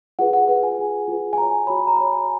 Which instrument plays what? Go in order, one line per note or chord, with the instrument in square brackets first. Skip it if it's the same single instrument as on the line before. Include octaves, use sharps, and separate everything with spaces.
[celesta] F4 G#4 B4 F#5
F#5
F4 G#4 B4 F#5
G#5
F4 G#4 B4
F4 G#4 B4
G#5
F#4 C#5 A#5
F#4 C#5 B5
A#5
F#4 C#5 B5
G#5